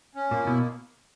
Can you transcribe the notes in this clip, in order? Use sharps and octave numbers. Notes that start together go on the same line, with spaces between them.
C#4
A#2 A#3
B2 E4